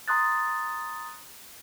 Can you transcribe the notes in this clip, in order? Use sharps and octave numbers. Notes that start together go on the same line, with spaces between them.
A#5 C6 D#6 F#6 A6